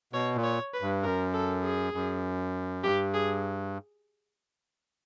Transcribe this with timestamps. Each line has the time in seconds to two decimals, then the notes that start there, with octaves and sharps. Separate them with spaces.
0.13 B2 C#5
0.35 A#2
0.44 C#5
0.74 B4
0.82 G2
1.03 F#2 A#4
1.34 A4
1.64 G#4
1.93 F#2
2.83 G2 G4
3.14 G#4